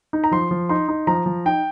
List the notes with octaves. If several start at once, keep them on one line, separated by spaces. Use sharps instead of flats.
D#4
A#5
F3 C6
F3
D#4 C6
D#4
F3 A#5
F3
D#4 G5